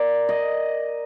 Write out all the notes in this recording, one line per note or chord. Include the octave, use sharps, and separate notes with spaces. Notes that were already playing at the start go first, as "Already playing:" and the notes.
Already playing: A#4 D5
D#5